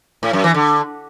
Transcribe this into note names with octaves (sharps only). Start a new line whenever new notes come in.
A2
F#2
E3
D3